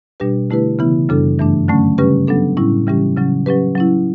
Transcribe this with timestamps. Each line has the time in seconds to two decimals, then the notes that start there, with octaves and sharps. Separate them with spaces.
0.20 B2 G3 D4 G4 B4
0.50 D3 A3 E4 G4 B4
0.79 C#3 E3 B3 E4
1.09 F#2 C#3 G3 D4 A4
1.39 G2 E3 A3 D4
1.68 D3 F#3 A3 C#4
1.98 C#3 G3 C#4 G4 B4
2.28 F#3 B3 D4 A4
2.57 A2 G3 C#4 E4
2.87 C#3 E3 G3 C#4 G4
3.16 C#3 F#3 C#4
3.46 F#3 C#4 G4 B4
3.75 F#3 C#4 E4